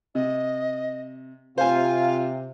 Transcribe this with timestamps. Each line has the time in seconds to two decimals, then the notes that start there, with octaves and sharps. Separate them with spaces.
0.15 C3 D#5
1.58 C3 F4 C5 F5 G#5